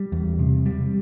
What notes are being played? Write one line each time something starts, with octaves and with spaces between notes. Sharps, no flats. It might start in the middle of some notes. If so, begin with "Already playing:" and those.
Already playing: G3
E2
C3
G3